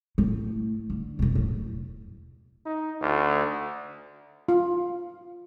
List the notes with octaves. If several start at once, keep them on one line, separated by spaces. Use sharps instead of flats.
A2
D3
E2 B2
A2 F#3
D#4
D2
F4